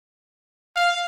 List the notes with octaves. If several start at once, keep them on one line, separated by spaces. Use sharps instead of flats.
F5